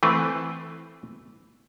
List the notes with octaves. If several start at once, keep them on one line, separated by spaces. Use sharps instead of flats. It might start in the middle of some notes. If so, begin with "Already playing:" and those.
E3 A3 C4 B4